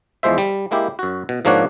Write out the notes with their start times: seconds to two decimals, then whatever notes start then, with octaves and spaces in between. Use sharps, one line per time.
0.23 E2 F3 G#3 C5 E5
0.38 G3
0.71 G#3 A#3 E4 G4
0.99 F#2 F#4
1.29 B2
1.45 G#2 F3 A#3 D4 C#5 F#5